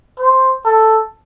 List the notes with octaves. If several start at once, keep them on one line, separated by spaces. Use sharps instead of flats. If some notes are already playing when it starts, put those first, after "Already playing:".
C5
A4